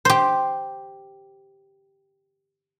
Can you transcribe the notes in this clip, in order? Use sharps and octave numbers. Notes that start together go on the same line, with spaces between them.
G4 C5